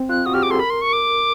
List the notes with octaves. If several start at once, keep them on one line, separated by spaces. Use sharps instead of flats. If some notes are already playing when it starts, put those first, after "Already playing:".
Already playing: C4
F4 F#6
F#4 D#6
G4 F6
G#4 D6
A4 C6
A#4 B5
C6
C#6
D6